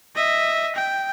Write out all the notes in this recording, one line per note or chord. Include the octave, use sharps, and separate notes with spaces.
D#5 E5
G5